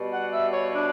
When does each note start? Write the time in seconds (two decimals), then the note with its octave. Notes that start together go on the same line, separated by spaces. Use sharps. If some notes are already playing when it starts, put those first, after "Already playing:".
Already playing: B2 G3
0.12 F#5
0.32 E5
0.52 C#5
0.72 D4